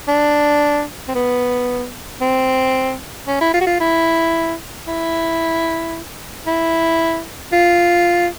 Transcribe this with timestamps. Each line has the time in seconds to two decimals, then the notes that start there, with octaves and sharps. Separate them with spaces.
0.08 D4
1.08 C4
1.15 B3
2.21 C4
3.28 C#4
3.41 E4
3.54 F4
3.61 F#4
3.67 F4
3.80 E4
4.88 E4
6.47 E4
7.53 F4